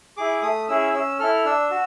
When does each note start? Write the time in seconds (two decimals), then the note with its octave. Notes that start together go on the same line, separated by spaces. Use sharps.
0.17 E4 G#4 D6
0.42 A3 D#6
0.68 C#4 E4 G#4 E6
0.94 C#4 E6
1.19 E4 A4 F6
1.45 D4 E6
1.71 F#4